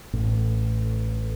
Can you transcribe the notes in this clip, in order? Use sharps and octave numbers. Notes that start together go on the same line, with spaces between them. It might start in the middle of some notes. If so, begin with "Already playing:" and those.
A1 A2